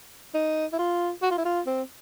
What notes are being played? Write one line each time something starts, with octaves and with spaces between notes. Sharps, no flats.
D#4
E4
F4
F#4
F4
E4
F4
C4